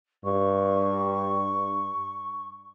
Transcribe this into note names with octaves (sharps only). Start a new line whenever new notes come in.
G2 C#6